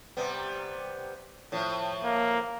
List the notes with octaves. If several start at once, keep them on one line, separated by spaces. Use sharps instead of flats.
C3 G3 B3
A2 F3
A#3